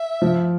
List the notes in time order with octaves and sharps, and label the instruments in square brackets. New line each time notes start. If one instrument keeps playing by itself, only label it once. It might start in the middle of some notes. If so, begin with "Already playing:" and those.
Already playing: [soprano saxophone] E5
[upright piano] F3